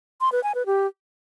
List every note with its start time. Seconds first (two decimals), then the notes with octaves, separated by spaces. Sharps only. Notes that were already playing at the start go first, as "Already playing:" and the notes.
0.21 C6
0.32 B4
0.43 G#5
0.55 B4
0.66 G4